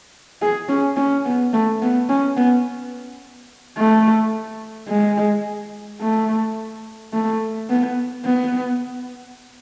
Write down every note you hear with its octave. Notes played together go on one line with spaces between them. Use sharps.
G#4
C#4
C#4
B3
A3
B3
C#4
B3
A3
G#3
A3
A3
B3
B3